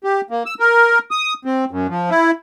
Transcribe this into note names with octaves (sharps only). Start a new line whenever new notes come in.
G4
A#3
E6
A#4
D#6
C4
F#2
F3
E4